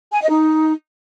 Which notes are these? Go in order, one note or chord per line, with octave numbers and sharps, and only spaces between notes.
G#5
D#5
D#4